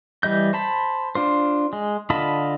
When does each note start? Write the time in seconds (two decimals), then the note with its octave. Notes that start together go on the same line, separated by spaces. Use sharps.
0.23 E3 G3 D#5 G6
0.53 C5 A5 B5
1.15 D4 F4 C5
1.73 G#3
2.10 D3 F4 D#5 A5 B5